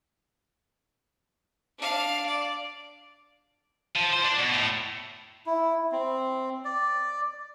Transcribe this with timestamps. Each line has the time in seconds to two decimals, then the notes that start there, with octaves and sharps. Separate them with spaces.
1.78 D4 F5
2.26 D5
3.96 F3
4.13 C5
4.25 D4
4.39 B2
4.54 A2
5.46 E4
5.92 C4
6.65 D5